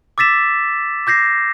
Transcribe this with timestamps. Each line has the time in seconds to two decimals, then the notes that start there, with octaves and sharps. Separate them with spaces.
0.18 D6 E6 A6 B6 E7
1.07 D6 G6 A#6 C7